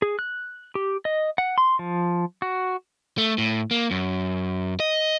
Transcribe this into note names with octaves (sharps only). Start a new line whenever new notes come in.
G#4
F#6
G4
D#5
F#5
C6
F3
F#4
A3
A2
A#3
F#2
D#5